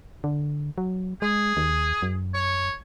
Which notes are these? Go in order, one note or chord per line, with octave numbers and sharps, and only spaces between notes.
D3
F#3
G#3 G#4
D#2
F#2
C#5